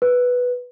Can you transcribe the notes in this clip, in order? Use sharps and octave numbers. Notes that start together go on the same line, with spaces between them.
B4